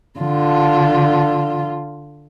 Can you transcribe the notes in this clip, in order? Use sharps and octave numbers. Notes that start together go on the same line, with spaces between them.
D3 F4